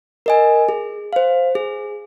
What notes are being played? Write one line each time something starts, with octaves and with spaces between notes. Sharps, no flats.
A#4 D#5 G#5
G#4
C5 F5
G#4